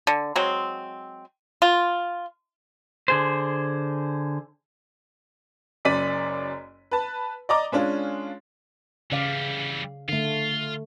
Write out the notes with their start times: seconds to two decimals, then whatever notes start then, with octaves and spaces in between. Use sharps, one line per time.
0.07 D3
0.36 F#3 G#3 C4
1.62 F4
3.08 D3 G#4 C5
5.85 F#1 F#2 D5 B6 D#7
6.91 B4 A5
7.49 D5 D#5 A#5 D6
7.72 G#3 C#4 D4 F4
9.12 C#3 E3 G3 D5 F5
10.09 D3 A3 F4